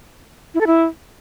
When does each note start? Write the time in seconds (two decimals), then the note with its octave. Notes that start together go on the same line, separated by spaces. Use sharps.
0.54 E4
0.61 A4
0.67 E4